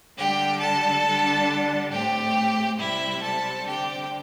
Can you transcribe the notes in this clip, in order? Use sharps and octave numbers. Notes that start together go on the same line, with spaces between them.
D3 G3 D4 G4 G5
A4 A5
D3 G3 D4
A2 A3 C4 G4 G5
C3 G3 C4 E4 E5
A4 A5
D3 C4 G4 G5